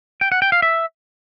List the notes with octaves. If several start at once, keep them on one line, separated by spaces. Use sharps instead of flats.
G5
F#5
G5
F5
E5